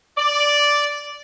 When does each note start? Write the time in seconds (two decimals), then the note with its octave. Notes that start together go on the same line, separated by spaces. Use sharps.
0.17 D5